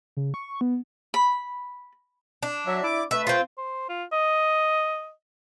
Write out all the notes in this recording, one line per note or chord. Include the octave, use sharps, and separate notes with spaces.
C#3
C#6
B3
B5
D4
F#3 E5
E4 D5 D6
A3 B4 E5
C4 F4
C5
F4
D#5